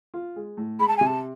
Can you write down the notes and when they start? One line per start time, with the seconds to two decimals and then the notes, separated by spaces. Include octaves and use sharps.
0.14 F4
0.36 G#3
0.57 A2
0.79 G#3 B5
0.88 A5
0.97 C3 G#5
1.06 A5